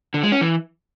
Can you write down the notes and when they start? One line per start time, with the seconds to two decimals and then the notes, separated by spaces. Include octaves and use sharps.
0.14 D3
0.23 G#3
0.32 C#4
0.41 E3